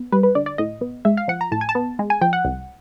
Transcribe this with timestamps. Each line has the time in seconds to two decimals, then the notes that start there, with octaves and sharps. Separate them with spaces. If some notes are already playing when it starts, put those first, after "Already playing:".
Already playing: B3
0.12 G3 B4
0.23 B4
0.35 D3 D5
0.46 D5
0.58 A2 D#5
0.81 B3
1.05 G#3 E5
1.17 F5
1.28 F3 F#5
1.41 A#5
1.52 A2 A5
1.61 G#5
1.69 A5
1.75 B3
1.99 G#3
2.10 G#5
2.21 F3 G5
2.33 F#5
2.45 C2